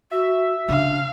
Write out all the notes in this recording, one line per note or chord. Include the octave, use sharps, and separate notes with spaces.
F#4 E5
C#3 D4 F5